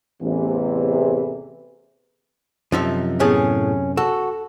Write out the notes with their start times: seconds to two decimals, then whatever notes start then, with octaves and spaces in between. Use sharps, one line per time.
0.21 A1 E2 C3 E3
2.72 F#2 C3 F3 D#4 E5
3.20 A2 B3 C#4 G#4
3.97 F#4 A4